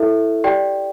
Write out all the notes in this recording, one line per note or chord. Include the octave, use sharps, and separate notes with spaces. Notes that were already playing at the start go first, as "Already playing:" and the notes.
Already playing: E4 A4 E5
G4 D5 G5